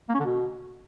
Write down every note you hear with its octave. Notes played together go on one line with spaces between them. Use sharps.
A#3
C#4
D3
B2